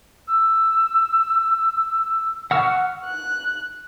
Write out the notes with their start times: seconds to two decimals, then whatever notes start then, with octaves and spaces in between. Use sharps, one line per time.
0.27 E6
2.51 F#5 C#6 E6 F6
3.05 F#6